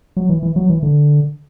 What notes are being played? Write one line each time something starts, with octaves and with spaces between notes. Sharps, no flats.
F#3
E3
E3
F#3
E3
D3